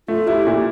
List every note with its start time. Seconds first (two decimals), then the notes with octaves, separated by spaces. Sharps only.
0.08 A3 F4
0.28 E4 G4
0.47 A#2 F4